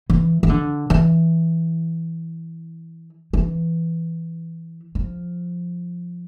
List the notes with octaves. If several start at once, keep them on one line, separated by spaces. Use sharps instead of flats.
E3
E3
D3
E3
E3
F3